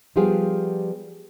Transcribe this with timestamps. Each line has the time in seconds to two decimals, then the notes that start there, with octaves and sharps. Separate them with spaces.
0.16 F3 G3 B3 F4 G4 G#4